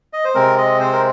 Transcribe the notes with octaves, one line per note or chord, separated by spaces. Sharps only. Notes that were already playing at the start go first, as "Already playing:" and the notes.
D#5
C5
C3 G#3 C4 A#4
D#5
C5
A#4